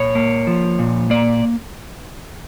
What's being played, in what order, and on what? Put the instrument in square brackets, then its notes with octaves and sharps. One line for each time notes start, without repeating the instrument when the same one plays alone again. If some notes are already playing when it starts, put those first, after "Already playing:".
Already playing: [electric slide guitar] A#2 C#5
A#3
F3
A#2
A#3 D5